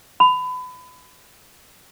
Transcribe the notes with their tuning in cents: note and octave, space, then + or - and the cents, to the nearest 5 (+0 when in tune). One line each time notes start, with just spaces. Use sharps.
B5 +30